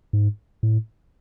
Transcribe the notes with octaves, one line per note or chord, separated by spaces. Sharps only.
G#2
A2